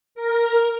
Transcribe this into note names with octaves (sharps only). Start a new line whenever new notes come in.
A#4